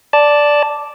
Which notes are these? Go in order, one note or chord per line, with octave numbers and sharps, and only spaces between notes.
D5 A5